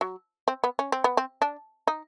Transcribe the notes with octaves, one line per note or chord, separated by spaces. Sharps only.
F#3
C4
B3
C#4
C4
B3
C4
D4
D#4